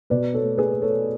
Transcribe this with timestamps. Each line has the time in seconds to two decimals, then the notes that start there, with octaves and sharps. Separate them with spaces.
0.10 B2 B4 D5
0.34 A4 C#5
0.42 A3
0.58 G#4 B4
0.73 A3
0.82 A4 C#5